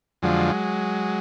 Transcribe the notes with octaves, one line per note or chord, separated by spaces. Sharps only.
F2 D3 F3 F#3 G#3